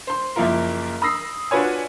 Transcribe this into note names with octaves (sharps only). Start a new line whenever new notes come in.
C5 C6
F#1 F3 A#3 E4 F4 A#4
B5 D#6 E6 A#6 C7
D4 F4 F#4 B4 C#5 G#5